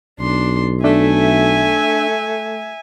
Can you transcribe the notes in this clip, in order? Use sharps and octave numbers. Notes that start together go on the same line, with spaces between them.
B1 D4 C6
A3 D4 E5 G#5